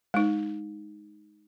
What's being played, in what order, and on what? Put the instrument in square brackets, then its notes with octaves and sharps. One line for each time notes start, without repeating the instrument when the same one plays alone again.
[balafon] G#3 D#4